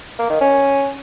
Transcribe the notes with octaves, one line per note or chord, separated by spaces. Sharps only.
A#3
D#3
C#4